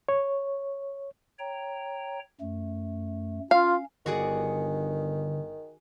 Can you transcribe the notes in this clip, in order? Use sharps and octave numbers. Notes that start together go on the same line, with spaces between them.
C#5
C#5 G5 A#5
F#2 A3
C#4 F4 F5
G1 D3 D#3 F#4 G#4 D5